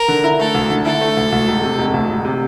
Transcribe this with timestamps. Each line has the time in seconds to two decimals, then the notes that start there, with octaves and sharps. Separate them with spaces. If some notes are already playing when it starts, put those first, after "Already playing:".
Already playing: A#4
0.08 D3
0.24 E4
0.39 A3 A4
0.54 D2
0.70 D3
0.85 E4 A4
1.01 A3
1.17 D2
1.32 D2
1.48 E1
1.63 C3
1.78 E1
1.94 D2
2.09 E1
2.25 C3